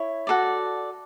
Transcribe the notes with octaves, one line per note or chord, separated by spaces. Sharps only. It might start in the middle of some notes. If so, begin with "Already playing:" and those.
Already playing: E4 C#5
F#4 A4 D5